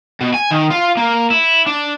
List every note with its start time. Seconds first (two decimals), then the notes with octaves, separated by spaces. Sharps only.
0.21 B2
0.34 G#5
0.51 D#3
0.70 F4
0.97 A#3
1.30 E4
1.67 D4